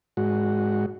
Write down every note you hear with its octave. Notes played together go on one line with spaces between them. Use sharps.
G#2 F#4